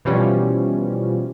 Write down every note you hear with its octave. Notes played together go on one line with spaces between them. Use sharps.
B2 E3 F3 G3 C#4